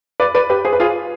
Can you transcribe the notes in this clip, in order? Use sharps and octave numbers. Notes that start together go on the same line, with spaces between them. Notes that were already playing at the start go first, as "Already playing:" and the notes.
B4 D5
B4 D5
G4 B4
G#4 C5
B4
F4 G#4